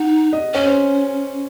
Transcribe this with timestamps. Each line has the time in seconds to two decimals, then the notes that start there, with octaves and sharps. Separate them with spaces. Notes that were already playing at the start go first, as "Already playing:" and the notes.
Already playing: D#4 F#5
0.33 D#5
0.54 C#4 C#5
0.66 C5